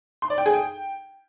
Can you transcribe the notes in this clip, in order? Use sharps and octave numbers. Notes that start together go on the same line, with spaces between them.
C6
D5
G5
G#4
G5